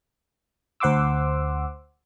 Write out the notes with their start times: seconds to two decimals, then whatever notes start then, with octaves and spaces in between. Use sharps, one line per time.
0.80 D2 C5 F#5 C6 D6 E6